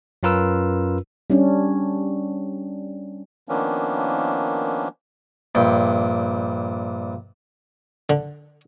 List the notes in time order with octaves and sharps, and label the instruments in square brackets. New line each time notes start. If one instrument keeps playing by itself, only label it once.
[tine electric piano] F#2 C#4 F4 A#4 B4 E6
[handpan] G3 C#4 D4
[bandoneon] D#3 F3 A#3 B3 C#4 D4
[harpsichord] A#1 G2 G5
D3